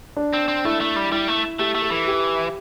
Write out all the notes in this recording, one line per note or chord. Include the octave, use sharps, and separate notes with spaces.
D4
C4
C4
A3 E4
A3
G3
G3 E4
A3
A3 G4
A3
A4
E3
G4